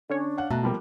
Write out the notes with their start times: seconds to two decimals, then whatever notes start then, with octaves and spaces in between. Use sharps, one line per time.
0.10 D3 C#4 D4 C#5
0.38 F5 F#5
0.51 B2 A3 A5 A#5 F#6
0.63 F3 G3 A#3 G5